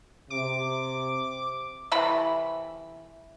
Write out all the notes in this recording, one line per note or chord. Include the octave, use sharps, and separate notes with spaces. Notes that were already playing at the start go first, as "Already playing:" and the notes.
C3 D6
C3 E3 A3 B5